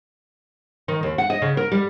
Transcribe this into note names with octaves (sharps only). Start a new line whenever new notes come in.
D#3
D#2
F#5
D#5
C#3
A#4
G3